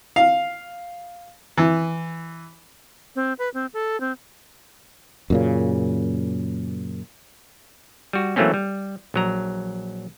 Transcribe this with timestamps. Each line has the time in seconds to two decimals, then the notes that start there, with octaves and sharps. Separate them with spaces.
0.16 F5
1.57 E3
3.16 C4
3.39 B4
3.54 C4
3.74 A4
4.00 C4
5.30 F#2 A#2 C#3
8.13 G3 F#4
8.36 E3 F#3 A3 A#3 C4 C#4
8.54 G3
9.14 A#1 F#3 A#5